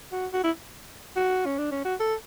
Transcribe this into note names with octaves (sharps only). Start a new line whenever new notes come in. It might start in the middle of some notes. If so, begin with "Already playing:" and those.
F#4
F#4
E4
F#4
C#4
D4
C#4
F#4
A4